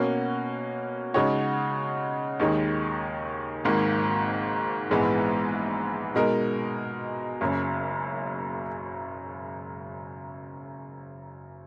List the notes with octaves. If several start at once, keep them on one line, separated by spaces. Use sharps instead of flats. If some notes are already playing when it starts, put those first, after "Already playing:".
Already playing: B2 A#3 C#4 F#4
C#3 G#3 D#4 F#4 C#5
D#2 D#3 G#3 D#4
G#1 G#2 D#3 A#3
A#1 G#2 E3 G#3 B3
B2 G#3 D#4 A#4
F#1 F#2 C#3